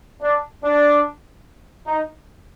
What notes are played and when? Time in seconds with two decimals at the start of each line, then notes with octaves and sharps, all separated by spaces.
0.21 D4
0.63 D4
1.86 D#4